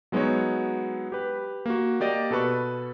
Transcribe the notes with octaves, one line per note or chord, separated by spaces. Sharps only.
F#3 G#3 B3 D#4 F#4 C#5
G4 B4
A#3 F#4
A#3 G4 D5 D#5
B2 A4 B4 C#6